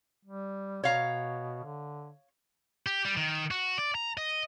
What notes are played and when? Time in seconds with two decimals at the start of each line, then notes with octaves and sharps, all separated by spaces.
0.25 G3
0.84 B2 C#5 F5 A#5
1.63 D3
2.86 G4
3.05 G3
3.17 D#3
3.51 F#4
3.78 D5
3.95 A#5
4.18 D#5